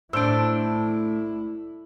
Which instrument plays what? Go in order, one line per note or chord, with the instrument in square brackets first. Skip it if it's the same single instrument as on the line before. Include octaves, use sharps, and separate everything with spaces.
[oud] A2 [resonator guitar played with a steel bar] D4 C5 [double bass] E4 [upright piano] E6 D7